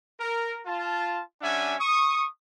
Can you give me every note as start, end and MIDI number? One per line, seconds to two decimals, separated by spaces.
0.19 0.59 70
0.66 1.21 65
0.66 1.21 81
1.42 1.75 55
1.42 1.75 61
1.42 1.75 62
1.42 1.75 76
1.42 1.75 78
1.42 1.75 80
1.80 2.26 85
1.80 2.26 87